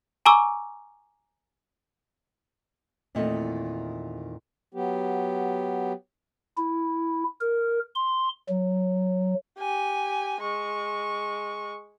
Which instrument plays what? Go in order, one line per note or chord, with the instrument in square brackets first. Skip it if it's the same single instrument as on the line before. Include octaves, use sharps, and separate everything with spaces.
[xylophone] G#5 A#5 C#6 D6 E6
[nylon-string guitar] E2 A#2 D#3 A3 C4 D#4
[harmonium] F#3 B3 G4
[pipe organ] E4
A#4
C6
F#3
[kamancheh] G4 G#5
G#3 C#6